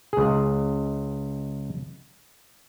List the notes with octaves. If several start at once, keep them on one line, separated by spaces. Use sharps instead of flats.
C#2 G#4